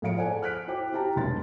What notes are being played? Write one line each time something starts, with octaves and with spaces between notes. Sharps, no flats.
A2 F3 G#4 F5 C#7 D7
A4 C5 D5 F#5 G#5
F6 F#6 B6 D7
E4 F#4 C5 G5 D6
E4 G4 G5 A5 A#5
F1 B1 G2 G#3 C6 A6